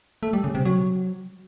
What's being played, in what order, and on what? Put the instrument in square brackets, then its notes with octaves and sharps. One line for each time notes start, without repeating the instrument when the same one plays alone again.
[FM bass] A3
G3
C#3
C3
F#3